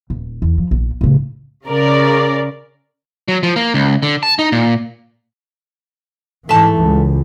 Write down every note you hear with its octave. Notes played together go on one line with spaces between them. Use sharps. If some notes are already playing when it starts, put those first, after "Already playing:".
D#1
E2
F3
A#1
A2 C#3
C#3 A#4 D5
F#3
F3
A#3
C#2
D3
A5
D#4
A#2
G#2 E3 A3 A5
C#2